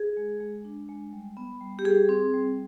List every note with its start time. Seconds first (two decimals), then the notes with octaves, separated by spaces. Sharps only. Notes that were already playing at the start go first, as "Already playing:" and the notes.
Already playing: G#4
0.17 G#3
0.40 G#3
0.65 D4
0.89 G#3
1.13 G3
1.37 B3
1.61 G3
1.79 G4
1.85 G3 G#4
2.09 C4
2.34 G3